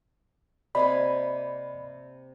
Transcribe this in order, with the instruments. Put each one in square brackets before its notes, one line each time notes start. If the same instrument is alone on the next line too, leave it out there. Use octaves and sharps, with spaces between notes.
[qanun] C3 A#3 G#5 [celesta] D5 D#5 [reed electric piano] B5